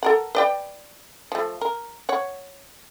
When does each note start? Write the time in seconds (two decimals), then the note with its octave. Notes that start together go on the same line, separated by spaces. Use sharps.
0.03 A4 A#4 F#5
0.35 B4 D5 G5
1.32 F3 A3
1.61 A#4
2.09 C#5 F#5